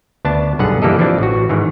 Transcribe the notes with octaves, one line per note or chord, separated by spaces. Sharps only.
D2 B3 D4 A5
B1 G2 D3 G#4 F#5
E3 G3 A#3 G4 A4 D#5
E3 F3 C4 D4
A1 F#4
G#2 D#3 E3